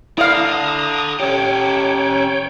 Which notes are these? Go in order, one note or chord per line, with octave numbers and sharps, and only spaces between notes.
E4 A4 D5 F5 A#5 D#6
C#4 G4 C#5 G5